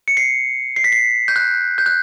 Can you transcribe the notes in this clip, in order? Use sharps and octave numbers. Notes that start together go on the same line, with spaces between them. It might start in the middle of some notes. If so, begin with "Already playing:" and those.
C#7
C7
C7
B6
C7
G6
F#6
G6
F#6